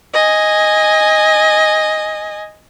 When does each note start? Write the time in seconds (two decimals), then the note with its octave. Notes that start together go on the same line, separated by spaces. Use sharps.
0.13 D#5 G#5